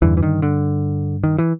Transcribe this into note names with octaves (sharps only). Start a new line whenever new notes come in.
E2 G2 D3 E3
E3
D#3
D3
D#3
E3